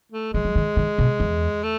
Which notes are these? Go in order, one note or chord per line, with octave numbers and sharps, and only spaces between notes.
A3
E3 G#3
F#3
D#3
D#3
B2
E2
A3